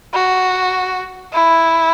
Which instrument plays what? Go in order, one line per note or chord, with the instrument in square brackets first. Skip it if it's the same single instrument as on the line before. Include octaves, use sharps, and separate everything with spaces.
[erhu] F#4
E4